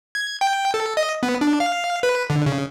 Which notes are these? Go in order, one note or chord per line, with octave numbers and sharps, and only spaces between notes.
G#6
G5
A4
D#5
B3
D4
F5
B4
D3
C#3